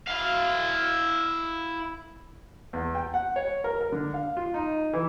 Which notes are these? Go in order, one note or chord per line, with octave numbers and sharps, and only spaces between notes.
E4 F5
E2
G5
F#5
C#5
A#4
A#4
D3
F5
F4
D#4
E3